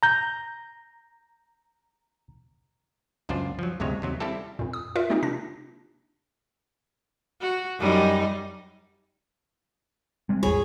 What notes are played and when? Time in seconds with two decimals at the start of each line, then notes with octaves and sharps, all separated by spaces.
0.03 A#5 G6
3.29 C#2 F#2 D4 F4 C5 D5
3.59 F3 F#3
3.80 D2 G2 C3 G#3 C#5
4.02 D#2 C3 F#3
4.20 G3 C4 E4 G4 A4
4.59 F2 A#2
4.73 D#6
4.96 F4 A#4 D5 E5
5.10 G#3 A#3 C4 D#4 F4 G4
5.23 C3 D4 A#6
7.41 F#4
7.79 F#2 G3 D#4
10.29 G3 G#3 C4
10.43 D1 G#1 E2 G#4 C#5 B5